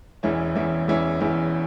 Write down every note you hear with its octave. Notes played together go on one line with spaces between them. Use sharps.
E1 E2 E3 C#4 E4
E1 E2 E3 C#4 E4
E1 E2 E3 C#4 E4
E1 E2 E3 C#4 E4